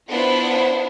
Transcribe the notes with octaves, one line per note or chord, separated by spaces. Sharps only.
B3 D4 E4 F4 C5